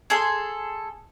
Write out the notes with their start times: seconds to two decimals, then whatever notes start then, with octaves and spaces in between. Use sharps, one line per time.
0.10 G#4 A4 C6